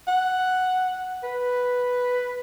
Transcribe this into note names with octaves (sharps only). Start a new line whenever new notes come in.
F#5
B4